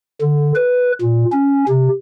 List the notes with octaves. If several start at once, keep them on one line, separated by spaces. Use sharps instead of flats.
D3
B4
A#2
C#4
C3